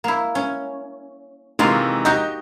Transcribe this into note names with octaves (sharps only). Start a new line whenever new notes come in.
A#3 E4
C#4
C3 D#3 E3 G#3 A#3 F4
D#4 F#4 G4 D#5 G6